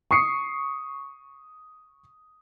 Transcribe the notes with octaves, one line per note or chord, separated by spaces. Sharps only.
C#6 D#6 C7 C#7